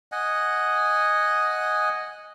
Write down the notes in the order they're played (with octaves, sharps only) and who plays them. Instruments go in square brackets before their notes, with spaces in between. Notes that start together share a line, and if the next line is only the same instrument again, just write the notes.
[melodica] D#5 F#5 G#5